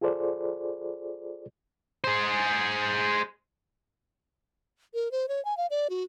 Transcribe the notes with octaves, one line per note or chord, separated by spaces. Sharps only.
F4 G#4 A4 C5 D5
G#4 C5
A#4
C5
C#5
G#5
F5
D5
F#4